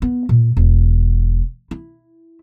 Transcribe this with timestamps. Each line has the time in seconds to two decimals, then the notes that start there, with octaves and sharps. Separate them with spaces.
0.02 B3
0.29 A#2
0.57 E1
1.71 E4